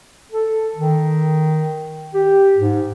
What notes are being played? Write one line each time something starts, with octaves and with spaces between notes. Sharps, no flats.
A4
D#3
G4
G#2